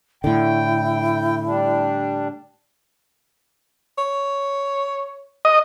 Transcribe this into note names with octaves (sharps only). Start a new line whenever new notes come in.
A2 D3 E4 G5
G3 D4
C#5
D#5